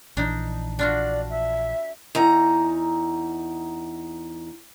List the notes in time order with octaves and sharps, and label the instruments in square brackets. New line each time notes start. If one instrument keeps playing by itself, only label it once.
[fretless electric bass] A#1 E3 [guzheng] D4 D#4
[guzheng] D4 F4 F#4 [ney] D5
[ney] E5
[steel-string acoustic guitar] E2 D#4 A#5